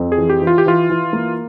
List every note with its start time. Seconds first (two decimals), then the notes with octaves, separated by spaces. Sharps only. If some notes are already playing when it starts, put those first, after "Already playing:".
Already playing: F2
0.12 G#4
0.18 E3
0.30 G4
0.42 E3
0.47 F4
0.58 G4
0.66 E3 F4
0.90 E3
1.13 A#3